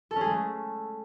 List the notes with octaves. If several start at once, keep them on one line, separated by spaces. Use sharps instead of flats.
A4
C#4
G#4
G#3
A3